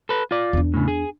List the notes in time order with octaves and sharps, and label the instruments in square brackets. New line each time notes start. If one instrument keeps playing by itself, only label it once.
[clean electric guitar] A4 B4
F4 D5
[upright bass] E2 D4
[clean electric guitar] A2 C#3
G#4